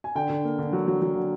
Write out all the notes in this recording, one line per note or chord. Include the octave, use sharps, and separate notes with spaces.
G#5
D3 G5
D3
A#3
D3
F#3
F#3
F#3
D3